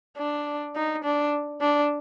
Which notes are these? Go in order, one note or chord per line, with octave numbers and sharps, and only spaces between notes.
D4
D#4
D4
D4